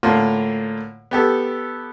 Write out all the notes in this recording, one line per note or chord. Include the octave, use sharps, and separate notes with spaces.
A2 D3 A#3 F4
B3 G4 A4